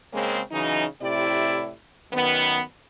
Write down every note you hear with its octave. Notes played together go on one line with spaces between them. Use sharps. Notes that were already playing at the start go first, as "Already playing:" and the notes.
C#3 G#3 A#3 C4 C#4
C#3 E3 F#3 D#4
A2 C3 E4 G4 D5
F#2 D#3 B3